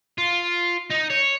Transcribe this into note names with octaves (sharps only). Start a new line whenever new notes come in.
F4
D#4
C#5